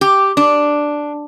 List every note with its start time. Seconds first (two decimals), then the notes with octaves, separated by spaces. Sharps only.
0.01 G4
0.37 D4